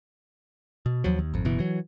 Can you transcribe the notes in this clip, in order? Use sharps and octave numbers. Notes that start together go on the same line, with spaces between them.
B2
D#2 F3 F#3
D#2
G#1 F2
F#1 B2 E3
E3 F#3